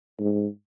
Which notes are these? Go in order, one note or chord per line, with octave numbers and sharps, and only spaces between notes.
G#2